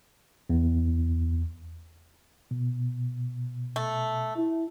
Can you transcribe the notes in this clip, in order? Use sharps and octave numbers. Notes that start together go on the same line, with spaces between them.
E2
B2
A3
E4